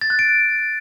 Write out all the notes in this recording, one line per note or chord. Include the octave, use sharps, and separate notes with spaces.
A6
F#6
D7